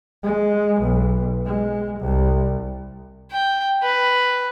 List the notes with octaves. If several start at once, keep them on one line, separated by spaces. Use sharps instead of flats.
G#3
B1
G#3
C2
G5
B4